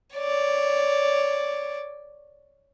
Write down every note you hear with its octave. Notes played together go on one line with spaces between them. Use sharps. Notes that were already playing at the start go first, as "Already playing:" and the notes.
C#5 D5